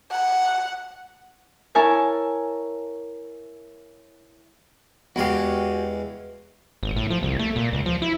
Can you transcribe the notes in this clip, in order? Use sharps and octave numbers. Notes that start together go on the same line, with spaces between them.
F#5
E4 A#4 C#5 E5 G#5 A5
E2 G#3 F#4 G4 F5
G#1
A2
F3
C2
A3
A#2
C#2
F3
E4